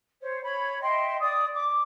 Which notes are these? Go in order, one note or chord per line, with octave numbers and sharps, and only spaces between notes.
C5 C#5
C#5 B5
D#5 E5 G5 C6
D5 D#6
D6